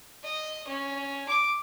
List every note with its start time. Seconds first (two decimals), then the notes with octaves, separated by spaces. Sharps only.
0.24 D#5
0.67 C#4
1.28 D6